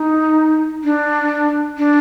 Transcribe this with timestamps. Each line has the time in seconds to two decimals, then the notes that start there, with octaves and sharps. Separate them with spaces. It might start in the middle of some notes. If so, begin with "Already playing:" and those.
Already playing: D#4
0.84 D4
1.78 D4